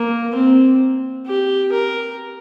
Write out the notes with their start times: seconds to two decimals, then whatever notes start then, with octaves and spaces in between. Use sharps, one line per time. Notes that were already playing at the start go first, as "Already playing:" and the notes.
Already playing: A#3
0.36 C4
1.26 G4
1.72 A#4